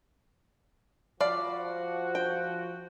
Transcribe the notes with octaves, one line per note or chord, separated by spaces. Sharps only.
F3 F#4 D5 F5 B5
G5